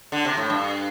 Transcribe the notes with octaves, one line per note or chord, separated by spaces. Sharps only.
D3
C3
A2
G2